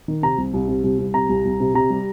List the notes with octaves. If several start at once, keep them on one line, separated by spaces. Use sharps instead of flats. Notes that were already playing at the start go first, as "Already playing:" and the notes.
D#3
C3 A#5
C2
C2
C3
C2
C2
C3 A#5
C2
C2
C3
C3 A#5
G3